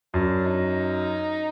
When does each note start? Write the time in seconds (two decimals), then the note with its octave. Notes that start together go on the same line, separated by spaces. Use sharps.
0.14 F#2 D4
0.46 D#4